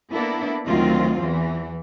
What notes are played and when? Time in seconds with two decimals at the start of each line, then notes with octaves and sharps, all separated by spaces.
0.12 A#3 B3 D4 E4 A4
0.66 D2 D#3 F#3 C4 F4
1.20 E2 E3